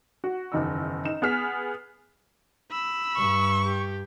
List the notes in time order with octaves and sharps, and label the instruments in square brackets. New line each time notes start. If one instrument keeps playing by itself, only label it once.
[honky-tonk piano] F#4
F#1 E2 D#3 D#5 E6
D#4 E7
B3 G#4 F6 B6
[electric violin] B5 E6
[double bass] G2 [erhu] C#6
[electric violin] G4